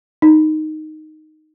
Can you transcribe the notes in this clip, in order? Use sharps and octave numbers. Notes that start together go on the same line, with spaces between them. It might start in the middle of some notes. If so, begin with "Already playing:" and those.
D#4